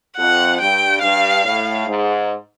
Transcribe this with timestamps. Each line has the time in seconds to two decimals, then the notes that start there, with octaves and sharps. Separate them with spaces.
0.17 F2 F#5
0.60 G2 G5
1.02 G2 F5
1.45 A2
1.87 G#2